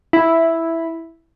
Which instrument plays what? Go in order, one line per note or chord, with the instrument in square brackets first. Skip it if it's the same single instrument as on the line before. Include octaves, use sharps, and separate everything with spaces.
[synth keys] E4